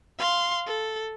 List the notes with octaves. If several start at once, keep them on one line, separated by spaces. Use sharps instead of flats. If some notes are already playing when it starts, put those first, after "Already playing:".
F5 C6
A4